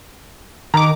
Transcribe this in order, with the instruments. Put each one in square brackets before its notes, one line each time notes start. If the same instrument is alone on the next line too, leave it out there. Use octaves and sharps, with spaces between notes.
[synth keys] D#3 D6 [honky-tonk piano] A#5